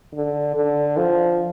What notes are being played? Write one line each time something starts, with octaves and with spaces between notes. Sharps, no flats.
D3
D3
F3